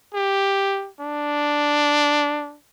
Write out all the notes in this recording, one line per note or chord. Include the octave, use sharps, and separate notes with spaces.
G4
D4